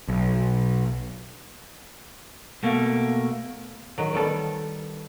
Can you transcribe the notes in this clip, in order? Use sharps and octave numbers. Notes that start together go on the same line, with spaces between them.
B1
B2 A3 A#3
D#3 F#3
D#3 G3 B3 A4